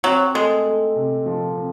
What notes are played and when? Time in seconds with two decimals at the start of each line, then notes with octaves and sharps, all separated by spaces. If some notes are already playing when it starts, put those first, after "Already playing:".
0.04 F#3 C4
0.34 G#3 A3
0.66 A3
0.96 C3
1.26 F3
1.57 C4